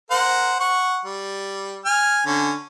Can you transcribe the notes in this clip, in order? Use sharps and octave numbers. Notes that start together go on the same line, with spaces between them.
A#4 C5 F#5
F#5 C#6
G3
G#5 F6
D3 C#4